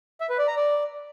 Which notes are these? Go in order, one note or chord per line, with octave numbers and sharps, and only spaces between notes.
E5
B4
D5
A#5
D5